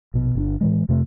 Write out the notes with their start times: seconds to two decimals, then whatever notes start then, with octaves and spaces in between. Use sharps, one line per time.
0.14 A#1 B2
0.35 G1 C#4 D4
0.61 A2 E3 G#3
0.89 F2 C3 A3